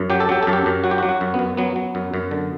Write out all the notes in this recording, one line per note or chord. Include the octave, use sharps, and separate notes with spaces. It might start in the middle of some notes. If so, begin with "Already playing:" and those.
Already playing: F#2
F#3 G4
A4
F#3 G4
F#2 A4
G4
F#2
F#3 F#4
G4
F#4
F#3
F#4
F#2
B3
F#2
F#3 B3
F#3
F#2
F#2
D3